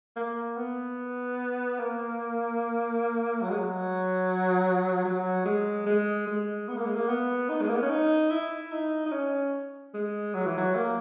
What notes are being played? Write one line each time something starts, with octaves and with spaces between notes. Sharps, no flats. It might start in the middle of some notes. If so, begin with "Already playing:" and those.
A#3
B3
A#3
F#3
G#3
F#3
F#3
G#3
G#3
G#3
B3
A#3
G#3
A#3
B3
D#4
G#3
A#3
B3
C#4
D#4
E4
D#4
D#4
C#4
G#3
F#3
E3
F#3
A#3